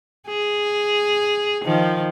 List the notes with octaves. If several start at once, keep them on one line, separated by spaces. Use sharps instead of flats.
G#4
D#3 F3